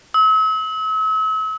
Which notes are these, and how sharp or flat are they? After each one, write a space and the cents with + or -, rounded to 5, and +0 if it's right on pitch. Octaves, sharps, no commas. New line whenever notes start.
E6 -40